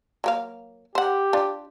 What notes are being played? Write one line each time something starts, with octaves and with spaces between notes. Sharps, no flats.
F#3 A#3 F5
G4 C5 F#5
D4 F4